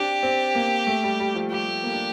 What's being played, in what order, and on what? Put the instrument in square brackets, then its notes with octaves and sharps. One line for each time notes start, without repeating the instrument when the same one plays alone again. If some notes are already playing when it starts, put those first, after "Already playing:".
Already playing: [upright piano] C4 D4 [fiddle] G4
[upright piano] C4
A#3
A3
G3
G3
F3
[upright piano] G3 [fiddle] G4
[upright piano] A3
A#3
D4